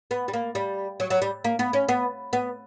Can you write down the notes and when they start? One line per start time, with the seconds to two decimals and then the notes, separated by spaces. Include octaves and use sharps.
0.11 B3
0.28 G3
0.33 A#3
0.55 G3
1.00 F#3
1.10 F#3
1.22 G3
1.44 A#3
1.59 B3
1.73 C#4
1.88 B3
2.33 B3